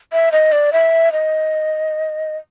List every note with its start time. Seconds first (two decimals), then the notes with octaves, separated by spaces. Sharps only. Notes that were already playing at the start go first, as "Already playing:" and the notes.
0.13 E5
0.32 D#5
0.52 D5
0.73 E5
1.12 D#5